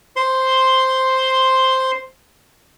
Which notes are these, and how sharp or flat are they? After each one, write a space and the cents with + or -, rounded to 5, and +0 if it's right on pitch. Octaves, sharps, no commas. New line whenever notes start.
C5 +0 C6 +0